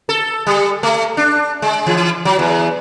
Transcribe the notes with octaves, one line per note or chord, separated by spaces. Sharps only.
A4
G3
A3
D4
G#3
E3
F#3
E2